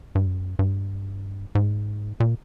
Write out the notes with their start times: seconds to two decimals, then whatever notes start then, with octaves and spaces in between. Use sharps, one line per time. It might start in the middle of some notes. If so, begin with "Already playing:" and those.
0.15 G2
0.26 F#2
0.59 G2
1.55 G#2
2.20 A#2